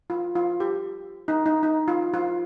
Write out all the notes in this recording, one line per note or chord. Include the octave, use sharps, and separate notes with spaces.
F4
F4
G4
D#4
D#4
D#4
F4
F4